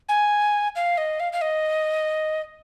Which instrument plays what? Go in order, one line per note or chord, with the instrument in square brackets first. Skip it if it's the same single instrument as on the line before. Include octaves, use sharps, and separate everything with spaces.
[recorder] G#5
F5
D#5
F5
F5
D#5